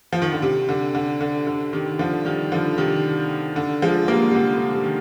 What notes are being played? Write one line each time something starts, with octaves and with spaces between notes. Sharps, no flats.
F3
D#3
D3
C3
D3
D3
D3
D3
C3 D#3
D3 F3
D#3 G3
D3 F3
C3 D#3
D3
F3 G#3
G3 A#3
C3
D3
D3
C3
D#3